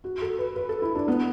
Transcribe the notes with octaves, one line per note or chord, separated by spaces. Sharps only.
F#4
A4
B4
B4
A4
E4
D4
B3